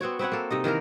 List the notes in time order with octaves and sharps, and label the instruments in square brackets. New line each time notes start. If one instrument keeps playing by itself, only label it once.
[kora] B3 C4 F#4 C#5
C4 B4 C#5 F#5
A#3 A4
C3 D#4 D#5
D#3 E3 A#3 A#4